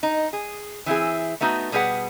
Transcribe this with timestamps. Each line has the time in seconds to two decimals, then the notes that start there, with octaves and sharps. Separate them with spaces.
0.03 D#4
0.33 G#4
0.86 E3 C4 E4 G#4
1.41 A3 B3 D#4 F#4
1.72 B2 G3 G#4 B4 F#5